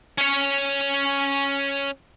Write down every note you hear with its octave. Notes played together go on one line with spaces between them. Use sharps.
C#4 C#5